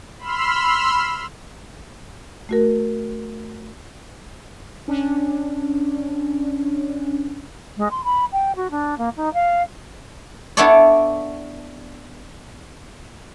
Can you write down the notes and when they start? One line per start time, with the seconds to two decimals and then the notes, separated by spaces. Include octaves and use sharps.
0.19 B5 C6 E6 F6
2.49 A3 F#4 A#4
4.88 C#4 D4
7.77 G#3
7.91 C6
8.04 B5
8.32 G5
8.56 F#4
8.71 D4
8.98 A#3
9.16 D#4
9.34 F5
10.57 B3 D4 E4 A4 C#5 D5